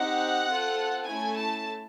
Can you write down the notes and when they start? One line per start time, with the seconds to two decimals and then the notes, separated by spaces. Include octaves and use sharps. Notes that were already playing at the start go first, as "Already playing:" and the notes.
Already playing: C4 D#4 G4 F#5
0.47 C4 F4 A4
1.08 A3 C#4 E4 A4 G#5
1.37 A5